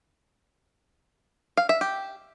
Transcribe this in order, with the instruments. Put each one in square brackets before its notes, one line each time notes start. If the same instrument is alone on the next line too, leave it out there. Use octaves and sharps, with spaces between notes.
[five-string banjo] F5
E5
G4